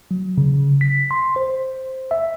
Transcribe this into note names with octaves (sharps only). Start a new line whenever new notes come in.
F#3
C#3
B6
C6
C5
E5